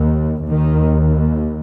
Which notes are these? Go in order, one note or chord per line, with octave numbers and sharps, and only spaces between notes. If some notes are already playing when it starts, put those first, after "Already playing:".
Already playing: D#2
D#2 D#3